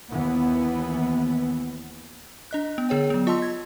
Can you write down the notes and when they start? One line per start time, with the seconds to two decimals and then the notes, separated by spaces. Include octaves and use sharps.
0.10 D#2 E3 B3
2.51 D4 D#5 F#6
2.78 B3
2.89 D3 G#4 C#5 G5
3.10 F#3 B3
3.27 F4 D#5 A5 C6 E6
3.42 G#6